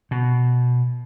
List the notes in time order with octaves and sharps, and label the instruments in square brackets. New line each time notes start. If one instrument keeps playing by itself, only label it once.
[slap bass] B2